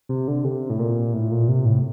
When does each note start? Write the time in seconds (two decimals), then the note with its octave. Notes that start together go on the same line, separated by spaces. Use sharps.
0.09 C3
0.28 D3
0.45 C3
0.70 A2
0.79 A#2
1.13 A2
1.31 A#2
1.48 C3
1.66 A2